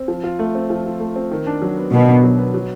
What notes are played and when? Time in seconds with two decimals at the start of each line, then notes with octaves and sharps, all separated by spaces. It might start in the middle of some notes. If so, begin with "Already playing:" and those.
Already playing: C4
0.08 F3
0.24 F4
0.39 A3
0.55 C4
0.70 F3
0.85 F4
1.00 A3
1.16 C4
1.31 D#3
1.47 D4
1.62 F#3
1.77 B3
1.92 B2 D#3
2.08 D4
2.23 F#3
2.38 B3
2.54 F#3